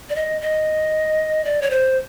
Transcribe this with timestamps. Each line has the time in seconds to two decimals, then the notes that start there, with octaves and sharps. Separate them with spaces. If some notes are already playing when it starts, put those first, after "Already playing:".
0.10 D5
0.16 D#5
0.41 D#5
1.45 D5
1.62 C#5
1.70 C5